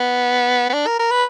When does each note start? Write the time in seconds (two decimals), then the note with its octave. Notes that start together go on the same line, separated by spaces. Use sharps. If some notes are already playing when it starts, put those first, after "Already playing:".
Already playing: B3
0.69 B3
0.73 D4
0.87 A#4
0.99 A#4
1.11 B4